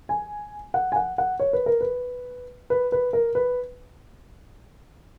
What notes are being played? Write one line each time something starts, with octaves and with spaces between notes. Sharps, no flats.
G#5
F#5
G#5
F#5
F#5
C#5
B4
A#4
B4
B4
B4
A#4
B4